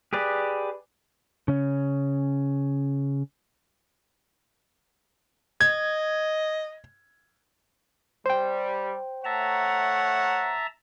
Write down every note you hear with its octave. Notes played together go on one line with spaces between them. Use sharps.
G4 G#4 B4 D5
C#3 C#4
D#5 G#6
G3 C5 G5
A3 C#5 E5 F#5 A5 A#5